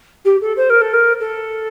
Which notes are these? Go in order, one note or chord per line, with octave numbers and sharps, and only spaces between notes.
G4
A4
C5
A#4
A4
A#4
A4